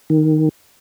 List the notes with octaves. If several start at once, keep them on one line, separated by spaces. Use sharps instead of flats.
D#3